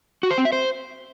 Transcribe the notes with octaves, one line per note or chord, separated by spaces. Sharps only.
F#4
C5
C4
E5
C5